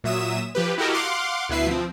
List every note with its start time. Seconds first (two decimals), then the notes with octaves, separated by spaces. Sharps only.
0.04 A#2 F#3 E5 D#6 E7
0.55 F3 G4 B4
0.78 E4 F#4 G4 A4 A#4 D#5
0.94 F5 F#5 C6 D6
1.49 D2 B2 E4 B4 E5 C7
1.67 F3 C4